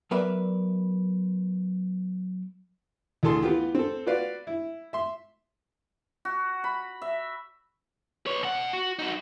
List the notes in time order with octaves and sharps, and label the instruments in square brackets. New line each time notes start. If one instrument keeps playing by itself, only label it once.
[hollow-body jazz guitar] F#3 B3 A#4 B4 D5 E5
[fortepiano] D2 E3 G#4 A4 A5 C6
E3 B3 F4 G4
C4 A4
F4 F#4 B4 D5 F5
E4
E5 C6
[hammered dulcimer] F#4
B5
E5
[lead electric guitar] B4 C#5
B2 F#5
F#4
D#4 F#4